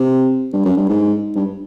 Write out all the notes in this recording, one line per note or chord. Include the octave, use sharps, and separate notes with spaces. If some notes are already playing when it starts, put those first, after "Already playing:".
Already playing: C3
G2
F#2
G2
G#2
G2